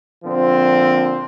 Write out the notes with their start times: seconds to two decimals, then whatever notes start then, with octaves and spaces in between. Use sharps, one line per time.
0.25 A#2 D3 F3 C4